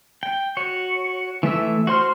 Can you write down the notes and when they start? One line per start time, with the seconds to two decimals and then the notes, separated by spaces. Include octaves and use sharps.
0.23 G5
0.57 F#4 C#5
1.43 E3 A3 E5 E6
1.87 F#4 C5 C6 F6